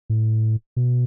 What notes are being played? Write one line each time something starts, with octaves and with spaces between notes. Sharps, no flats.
A2
B2